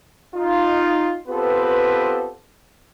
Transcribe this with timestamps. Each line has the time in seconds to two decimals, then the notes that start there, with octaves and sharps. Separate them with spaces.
0.35 D#4 F4
1.28 B3 C4 F4 G4 A4 B4